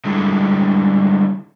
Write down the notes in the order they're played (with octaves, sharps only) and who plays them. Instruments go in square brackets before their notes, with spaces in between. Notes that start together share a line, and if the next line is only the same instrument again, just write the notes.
[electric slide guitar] D3 G3 G#3 E4 A4